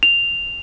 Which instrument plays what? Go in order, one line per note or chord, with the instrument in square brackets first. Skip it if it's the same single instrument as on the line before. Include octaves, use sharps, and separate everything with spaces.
[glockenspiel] F7